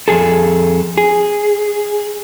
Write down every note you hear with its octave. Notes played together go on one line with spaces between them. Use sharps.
F2 A#2 G#4 A4
G#4